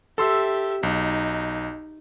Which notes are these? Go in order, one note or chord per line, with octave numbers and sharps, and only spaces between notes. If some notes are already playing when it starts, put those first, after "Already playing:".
G4 A4 E5 C6 E6
B1 D#4